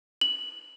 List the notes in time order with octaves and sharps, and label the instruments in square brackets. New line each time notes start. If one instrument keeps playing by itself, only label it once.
[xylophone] F#7